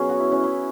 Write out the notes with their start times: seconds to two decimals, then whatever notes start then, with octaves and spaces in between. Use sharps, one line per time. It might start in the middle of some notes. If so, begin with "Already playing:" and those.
Already playing: B2 F#3 C#4 G#4 B4
0.09 F#4
0.20 E4
0.32 C#4
0.44 E4